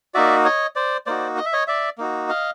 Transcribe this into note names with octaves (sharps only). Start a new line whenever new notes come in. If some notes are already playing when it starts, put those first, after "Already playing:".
A#3 D#4 F#4 D5 E5
C#5 D#5
C5 D5
A#3 D#4 F#4 C5 D5
D#5
E5
C#5 D#5
D5 E5
A#3 D#4 F#4
D#5 F5